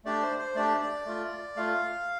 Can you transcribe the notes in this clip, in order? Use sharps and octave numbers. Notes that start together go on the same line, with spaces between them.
A3 D4 G4 D5
C5
C5
A3 D4 G4 D5
D5
A3 F4
A3 F4 F5